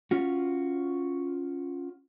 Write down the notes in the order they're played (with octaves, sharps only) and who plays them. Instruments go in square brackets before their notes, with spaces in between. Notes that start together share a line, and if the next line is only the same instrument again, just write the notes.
[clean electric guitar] C#4 F4 F#4